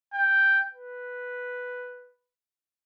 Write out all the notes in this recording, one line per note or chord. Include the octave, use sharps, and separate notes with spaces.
G5
B4